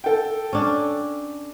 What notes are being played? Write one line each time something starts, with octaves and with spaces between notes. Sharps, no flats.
A4 G5
C#4 D4